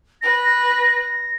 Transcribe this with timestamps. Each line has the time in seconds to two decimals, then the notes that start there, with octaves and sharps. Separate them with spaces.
0.21 B4 A#6